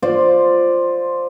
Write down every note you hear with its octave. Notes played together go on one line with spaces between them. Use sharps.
F4 C5 D5